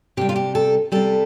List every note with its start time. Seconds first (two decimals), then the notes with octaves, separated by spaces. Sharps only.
0.17 C3 G3 G4
0.29 F4
0.36 G4
0.55 A4
0.92 C3 G3 A4